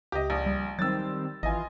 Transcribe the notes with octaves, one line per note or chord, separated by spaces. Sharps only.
C#2 G4 D#5
A#1
G3
D#3 F#3 G3 C4 E6 A6
G#1 E3 F4 D#5 G#5